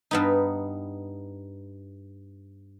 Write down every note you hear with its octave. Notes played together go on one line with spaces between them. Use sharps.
G2 B3 D#4